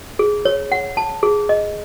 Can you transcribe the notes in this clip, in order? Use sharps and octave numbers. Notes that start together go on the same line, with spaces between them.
G#4
C#5
F#5
A5
G#4
D#5